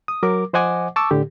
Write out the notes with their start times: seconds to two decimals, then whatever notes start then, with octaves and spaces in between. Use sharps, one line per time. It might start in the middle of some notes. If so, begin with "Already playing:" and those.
0.08 D#6
0.23 F#3 A#4 D6
0.53 F3 C5 D#5 F#5 G#5 D6
0.96 A5 C#6 D6 E6
1.11 A2 D3 G4